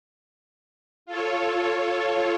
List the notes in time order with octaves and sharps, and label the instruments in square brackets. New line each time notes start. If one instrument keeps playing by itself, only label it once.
[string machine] F4 A4 C#5